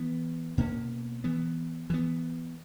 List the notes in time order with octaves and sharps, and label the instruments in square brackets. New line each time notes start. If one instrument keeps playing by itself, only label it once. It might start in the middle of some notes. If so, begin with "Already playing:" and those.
Already playing: [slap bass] E3 B3
B2 A#3 C#4
E3 B3
E3 B3